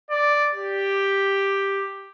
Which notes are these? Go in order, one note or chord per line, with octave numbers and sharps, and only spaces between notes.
D5
G4